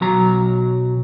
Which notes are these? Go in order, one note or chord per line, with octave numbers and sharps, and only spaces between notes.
B1 F#3 A#5